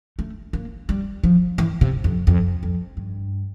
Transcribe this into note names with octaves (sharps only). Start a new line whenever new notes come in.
A3
A#3
G3
F3
E3
C3
F2
F2
F2
G2